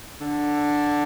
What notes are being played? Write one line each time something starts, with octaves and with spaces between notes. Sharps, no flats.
D3